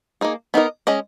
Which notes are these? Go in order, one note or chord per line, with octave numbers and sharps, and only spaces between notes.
A#3 D#4 G#4
B3 D#4 A#4 D#5
G#3 C#4 G#4 D#5